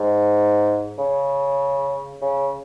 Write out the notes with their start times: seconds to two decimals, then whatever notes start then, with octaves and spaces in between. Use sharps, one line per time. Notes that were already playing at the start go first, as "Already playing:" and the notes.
Already playing: G#2
0.98 C#3
2.22 C#3